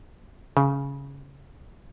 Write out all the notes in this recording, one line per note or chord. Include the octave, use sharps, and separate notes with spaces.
C#3